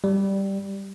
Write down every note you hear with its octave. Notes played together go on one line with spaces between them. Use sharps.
G3